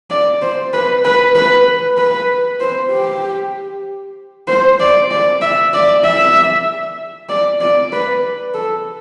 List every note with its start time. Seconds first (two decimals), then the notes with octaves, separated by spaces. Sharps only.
0.10 D5
0.42 C5
0.74 B4
1.05 B4
1.35 B4
1.98 B4
2.60 C5
2.92 G4
4.48 C5
4.80 D5
5.11 D5
5.41 E5
5.74 D5
6.04 E5
7.29 D5
7.61 D5
7.92 B4
8.54 A4